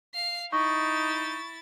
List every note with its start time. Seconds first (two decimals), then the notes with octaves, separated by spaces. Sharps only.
0.14 F5 C7
0.52 D#4 E4 C#6 A6